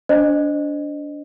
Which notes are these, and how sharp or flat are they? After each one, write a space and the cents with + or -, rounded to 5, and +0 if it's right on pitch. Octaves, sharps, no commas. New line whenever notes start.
D4 -25 C5 +0 D#5 -25